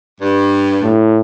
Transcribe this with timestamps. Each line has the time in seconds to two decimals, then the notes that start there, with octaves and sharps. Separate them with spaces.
0.21 G2
0.83 A2